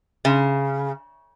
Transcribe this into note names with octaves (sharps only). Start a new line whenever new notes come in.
C#3